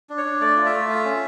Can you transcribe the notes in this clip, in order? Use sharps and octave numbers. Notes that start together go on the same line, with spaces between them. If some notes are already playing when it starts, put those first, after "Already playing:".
D4
C#5
D4
A3 D5
F4
E5
A3
F4
C#4